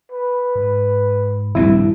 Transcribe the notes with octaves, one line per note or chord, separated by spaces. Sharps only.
B4
G#2
D#1 A#1 G2 C4 E4